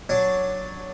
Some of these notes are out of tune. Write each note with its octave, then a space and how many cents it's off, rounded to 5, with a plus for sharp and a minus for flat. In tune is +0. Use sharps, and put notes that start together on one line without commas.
F#3 +0 D4 +0